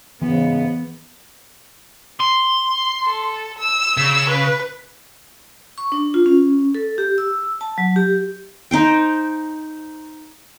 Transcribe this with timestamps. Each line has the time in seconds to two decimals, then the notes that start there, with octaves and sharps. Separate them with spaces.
0.22 G#2 C#3 E3 B3
2.20 C6
3.05 A4
3.58 E6
3.97 C#3
4.29 B4
5.78 C#6
5.92 D4
6.14 F4
6.26 C#4
6.75 A4
6.98 G4
7.18 E6
7.61 A5
7.78 F#3
7.96 G4
8.71 D#4 C5 G5